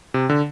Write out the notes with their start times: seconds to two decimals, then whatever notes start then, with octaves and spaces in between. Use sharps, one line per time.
0.14 C3
0.29 D3